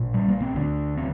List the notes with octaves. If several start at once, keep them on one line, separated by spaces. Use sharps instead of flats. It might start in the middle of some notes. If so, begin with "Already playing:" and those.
Already playing: A#1 A#2
G3
A#3
C4
D2 D3 D4
C4